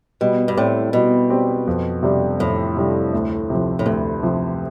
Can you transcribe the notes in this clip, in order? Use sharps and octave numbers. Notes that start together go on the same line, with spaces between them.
B2 G3
G2
A2 C4 G4 D5
B2 G3
C4 G4 D5
F2
C3 G3 D4
F2 A2
C3 G3 D4
D2
C3 F3
A2
D2 G2
C3 F3